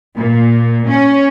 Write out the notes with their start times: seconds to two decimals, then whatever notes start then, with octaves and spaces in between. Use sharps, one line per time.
0.17 A#2
0.89 C#4